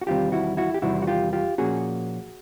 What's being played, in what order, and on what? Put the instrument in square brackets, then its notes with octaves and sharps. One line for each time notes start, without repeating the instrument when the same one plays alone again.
[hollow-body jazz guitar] F#4
E2 C3 D#3 G3 C4 F4 G4
E4 F#4
E4 F#4
G4
E2 C3 D#3 G3 C4 E4 F#4
F#4
F4 G4
F4 G4
A#2 F3 A#3 C#4 F#4 G#4